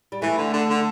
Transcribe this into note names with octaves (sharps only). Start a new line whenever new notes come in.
G3
E3 A3
D3
D3
D3